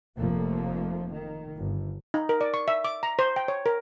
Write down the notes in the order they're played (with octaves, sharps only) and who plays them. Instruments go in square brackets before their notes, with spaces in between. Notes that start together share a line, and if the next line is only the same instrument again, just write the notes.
[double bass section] F1 F2 F3 A3 A#3
D#3
G1
[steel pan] D#4
A#4
D5
C#6
E5
D6
A#5
C5
G5
C#5
A#4